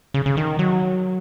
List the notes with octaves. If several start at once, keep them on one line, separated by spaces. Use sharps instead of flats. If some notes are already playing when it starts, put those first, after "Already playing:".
C#3
C#3
D#3
F#3